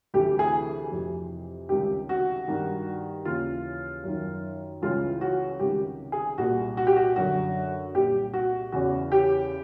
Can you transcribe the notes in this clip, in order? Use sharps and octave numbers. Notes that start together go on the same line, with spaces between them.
D2 C3 E3 G4
G#4
F2 C3 E3
C#2 C3 D#3 G4
F#4
G2 D#3
D#2 C#3 E3 F4
F#2 D#3
C#2 C#3 E3 F4
F#4
C#2 C3 D#3 G4
G#4
C2 A#2 F#4
F#4
G4
F#4
F#2 D3 F#4
C2 A#2 G4
F#4
E2 C#3 E3 F#4
G4